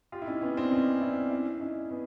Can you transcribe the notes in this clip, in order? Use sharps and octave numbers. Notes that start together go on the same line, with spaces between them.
F4 G4
E4
C#4 D#4
B3 C#4
C4 D4
C#4 D#4
D4 E4
D4 E4
C#4 D#4
B3 C#4